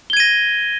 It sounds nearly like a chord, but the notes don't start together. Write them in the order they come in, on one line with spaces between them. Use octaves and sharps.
G7 G#6 D#7 A#6